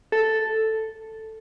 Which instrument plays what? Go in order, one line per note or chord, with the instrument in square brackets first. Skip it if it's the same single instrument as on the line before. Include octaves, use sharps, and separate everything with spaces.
[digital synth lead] A4